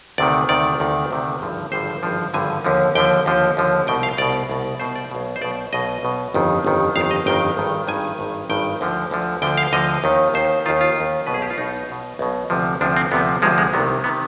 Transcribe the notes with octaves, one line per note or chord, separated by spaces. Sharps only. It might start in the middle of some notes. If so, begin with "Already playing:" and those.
D2 C3 D#3 D5
D2 C3 D#3 D5
D2 C3 D#3
D2 C3 D#3
G#1 G2 D3 F3
G#1 G2 D3 F3 C5
G#1 G2 D3 F3
G#1 G2 D3 F3 G#5
D#2 D3 F3
D#2 D3 F3 G5
D#2 D3 F3
D#2 D3 F3
C2 B2 G5
F5
C2 B2 D5
C2 B2
C2 B2 C5
D5
B1 B2
C5
B1 B2 D5
B1 B2 D#5
B1 B2
G1 F2 D#3
G1 F2 D#3
G1 F2 D#3 F5
D#5
G1 F2 D#3 G5
G#1 G2 D#3
G#1 G2 D#3 G#5
G#1 G2 D#3
G#1 G2 D#3 G5
D2 D3 F3
D2 D3 F3
D2 D3 F3 G5
F5
D2 D3 F3 D#5
D#2 D#3
D#2 D#3 C5
D#2 D#3 F4
F4
D#2 D#3
B1 B2 B4
G#4
G4
F4
B1 B2 D#4
B1 B2
B1 B2
D2 C3 F3
D2 C3 F3 D4
C4
D2 C3 F3 B3
D2 C3 F3 G#3
G#3
C2 C3 D#3 B3
C3 D#3 B3